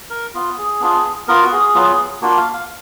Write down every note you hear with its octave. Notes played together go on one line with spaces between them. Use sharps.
A#4
B3 F4
G#4
B3 D4 F4
B3 F4 A#4
F#4
G#4
F#3 B3 F4
A#3 D4 F4 F#4
F5
F5